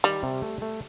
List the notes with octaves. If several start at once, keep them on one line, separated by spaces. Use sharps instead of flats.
D#3 G3
C3
A3
A3